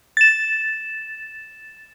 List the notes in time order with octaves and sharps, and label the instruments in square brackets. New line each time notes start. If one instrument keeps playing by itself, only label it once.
[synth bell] A6 E7